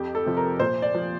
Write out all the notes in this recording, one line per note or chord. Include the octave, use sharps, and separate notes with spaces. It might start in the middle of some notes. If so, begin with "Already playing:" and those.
Already playing: F2 G4
A4
C3 F3
A#4
A#2 C5
D5
F3